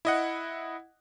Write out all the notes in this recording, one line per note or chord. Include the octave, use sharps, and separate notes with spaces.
E4 D#5 F#5